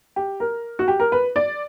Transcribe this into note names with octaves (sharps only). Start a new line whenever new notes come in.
G4
A#4
F#4
G4
A#4
B4
D5